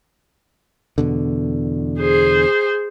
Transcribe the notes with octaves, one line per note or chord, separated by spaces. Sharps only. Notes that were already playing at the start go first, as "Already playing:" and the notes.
E2 B2 D3
G#4 C5